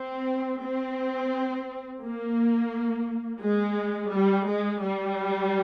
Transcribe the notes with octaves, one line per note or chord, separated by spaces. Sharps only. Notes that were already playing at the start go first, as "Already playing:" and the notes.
Already playing: C4
C4
A#3
G#3
G3
G#3
G3